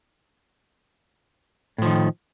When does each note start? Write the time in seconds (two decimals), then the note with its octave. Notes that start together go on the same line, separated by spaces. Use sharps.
1.78 A2
1.82 F3
1.86 D#3